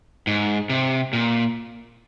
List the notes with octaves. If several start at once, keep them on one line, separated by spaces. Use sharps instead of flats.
G#2
C3
A#2